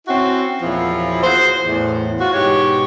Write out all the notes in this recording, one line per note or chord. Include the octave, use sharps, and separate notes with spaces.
C4 C#4 E4 F#4
E2 A#2 F3 F#3 E4
F#4 G#4 C5
E2 A2
F4 F#4
G#2 B2 G4 C#5